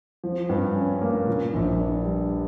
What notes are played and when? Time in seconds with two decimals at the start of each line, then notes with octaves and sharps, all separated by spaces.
0.24 F3
0.49 G2
0.75 C#4
1.01 A#3
1.27 A#2
1.54 A#1
1.79 D4
2.05 G3